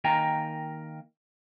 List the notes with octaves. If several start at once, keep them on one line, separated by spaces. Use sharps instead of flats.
D#3 A#3 A#4 G5 G#5 A#5